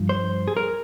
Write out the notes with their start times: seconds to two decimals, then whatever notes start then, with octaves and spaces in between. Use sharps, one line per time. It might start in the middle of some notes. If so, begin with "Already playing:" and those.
Already playing: G2 F3
0.09 C5
0.48 G#4
0.57 A#4